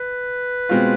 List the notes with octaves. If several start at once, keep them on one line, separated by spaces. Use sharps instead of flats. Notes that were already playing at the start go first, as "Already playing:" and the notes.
Already playing: B4
B2 G#3 C4 F4